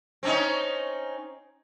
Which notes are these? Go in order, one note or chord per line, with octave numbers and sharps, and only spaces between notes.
C4 C#4 D#4